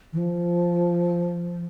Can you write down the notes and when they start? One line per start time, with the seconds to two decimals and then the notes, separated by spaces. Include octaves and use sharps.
0.12 E3
0.17 F3